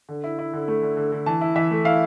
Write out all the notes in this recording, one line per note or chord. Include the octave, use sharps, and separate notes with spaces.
D3
E4
E4
D3
A3
D3
D3
D3
E3 A5
E4
E3 E5
A3
E4 F5